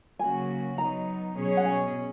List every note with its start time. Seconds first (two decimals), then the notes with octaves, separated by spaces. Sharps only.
0.19 C#3 F#3 A#3 C#4 F#4 G#5
0.78 F#3 B3 D#4 A#5
1.36 B2 F#3 C#4 G#4 C#5
1.57 F#5
1.65 G#5